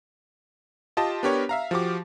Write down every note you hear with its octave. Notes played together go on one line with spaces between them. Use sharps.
F4 G4 D#5 A5
B3 D4 G4 A#4 C#5
E5 F5 A#5
F3 F#4 G4 D6